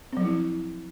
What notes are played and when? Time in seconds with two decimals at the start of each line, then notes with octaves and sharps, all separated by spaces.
0.13 C4
0.17 F#3
0.21 F3
0.25 E4